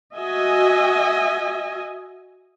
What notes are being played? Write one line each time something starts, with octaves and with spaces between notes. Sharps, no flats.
F#4 D#5 E5 G#5